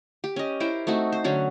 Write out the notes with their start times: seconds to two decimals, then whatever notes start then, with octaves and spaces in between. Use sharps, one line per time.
0.24 G4
0.36 C#4 D#5
0.60 E4 A#4 C5 G5
0.87 A3 C4 D#4 F#4
1.12 C5
1.24 D3 F#3 C#4 F#5